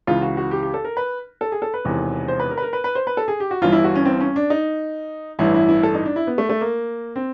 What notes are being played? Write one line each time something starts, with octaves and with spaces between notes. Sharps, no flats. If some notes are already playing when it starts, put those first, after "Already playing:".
C#2 C#3 E3 F4
F#4
F#4
G4
G4
A4
A#4
B4
A4
G#4
A4
B4
E1 E2 C3 D#3
C5
B4
A#4
B4
A#4
B4
B4
C5
B4
A4
G#4
G4
F#4
G1 G2 E3 F4
E4
F#4
C#4
C4
C#4
D4
D#4
A1 G2 E3 E4
E4
E4
A4
D#4
D4
E4
B3
A3
A3
A#3
C4